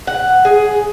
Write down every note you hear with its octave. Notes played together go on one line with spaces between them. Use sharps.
F#5
G#4